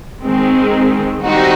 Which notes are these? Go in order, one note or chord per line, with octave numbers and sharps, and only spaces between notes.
D#3 G#3 C4
D#3 G3 C4 D#4 F#4